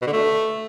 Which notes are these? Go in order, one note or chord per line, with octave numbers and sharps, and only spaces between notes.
B2
D3
A3